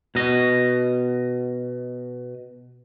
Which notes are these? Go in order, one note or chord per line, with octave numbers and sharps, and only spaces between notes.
B2 D#5